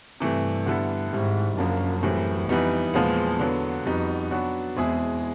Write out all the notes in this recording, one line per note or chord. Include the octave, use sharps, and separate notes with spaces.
G2 C3 E3 A3
D3 G3 B3 E4 A4
G#2 D#3 G3 C4 E4
F#2 C#3 F3 A#3 D4
A2 E3 G3 C4
F2 E3 G3 B3 D#4
E2 A#2 F3 G#3 B3
D3 F#3 B3
F2 G3 B3 D#4 F#4
F#3 B3 D4 F#4 B4
E2 B2 G#3 C4 E4 G#4